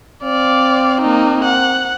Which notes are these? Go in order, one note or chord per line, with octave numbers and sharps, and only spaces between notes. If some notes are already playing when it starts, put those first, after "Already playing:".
C4 D5 F5
A#3 D#4
F#5